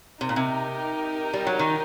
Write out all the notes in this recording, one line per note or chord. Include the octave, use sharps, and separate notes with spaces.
C3 D#4 G4 A#4
A#2
C3
G3
F#3
D#3